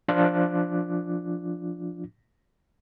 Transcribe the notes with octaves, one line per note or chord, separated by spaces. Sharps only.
F3 D4 F4 D6 F#6